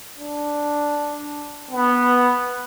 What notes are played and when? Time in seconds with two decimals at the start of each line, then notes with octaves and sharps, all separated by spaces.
0.18 D4
1.71 B3